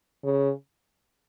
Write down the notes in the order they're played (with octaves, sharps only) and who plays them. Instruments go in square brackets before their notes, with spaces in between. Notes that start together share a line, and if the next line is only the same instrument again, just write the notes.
[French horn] C#3